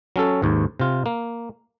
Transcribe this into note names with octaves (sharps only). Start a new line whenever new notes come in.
F#3 C#4 A4
D#2 G#2
C3 F4
A#3